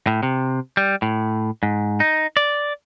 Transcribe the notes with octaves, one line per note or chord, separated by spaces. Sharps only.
A2
C3
G3
A2
G#2
D#4
D5